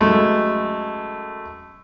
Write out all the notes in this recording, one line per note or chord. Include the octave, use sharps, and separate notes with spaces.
F#2 G#3 A3